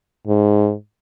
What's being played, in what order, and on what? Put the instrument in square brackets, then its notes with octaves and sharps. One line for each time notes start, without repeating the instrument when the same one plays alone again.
[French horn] G#2